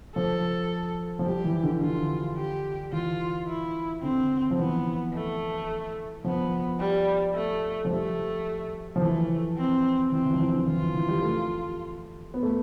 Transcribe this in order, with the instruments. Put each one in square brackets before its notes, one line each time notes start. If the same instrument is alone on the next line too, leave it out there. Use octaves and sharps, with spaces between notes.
[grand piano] F3 [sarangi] A4
[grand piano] F3
[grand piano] G3 [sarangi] G4
[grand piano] E3
D3
[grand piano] D3 [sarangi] F4
[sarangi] G4
[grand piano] E3 [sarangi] F4
[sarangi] E4
[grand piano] D3 [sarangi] C4
[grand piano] F3
[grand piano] E3 [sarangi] B3
[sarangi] A3
[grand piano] F3 [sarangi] B3
[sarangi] G3
A3
[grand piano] F3
[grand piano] G3 [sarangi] A3
[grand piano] F3
[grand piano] E3 [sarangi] A3
[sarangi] C4
[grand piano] E3 [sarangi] C4
[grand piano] E3
F3
E3
D3
[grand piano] E3 [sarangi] F4
[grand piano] D3
E3
G3
A3
B3
A3